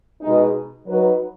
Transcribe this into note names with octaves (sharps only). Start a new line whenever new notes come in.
B2 G#3 D#4
F#3 D#4 F#4 B4